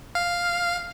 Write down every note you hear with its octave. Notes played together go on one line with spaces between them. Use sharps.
F5